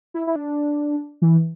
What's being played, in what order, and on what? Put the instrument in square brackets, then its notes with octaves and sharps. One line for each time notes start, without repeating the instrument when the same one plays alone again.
[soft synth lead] E4
E4
D4
E3